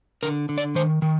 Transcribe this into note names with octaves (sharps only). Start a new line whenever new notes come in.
D3 A#4
D3
D5
D#3 C5
D#3